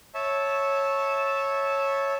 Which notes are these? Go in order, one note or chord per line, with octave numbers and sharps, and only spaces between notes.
C#5 E5 A5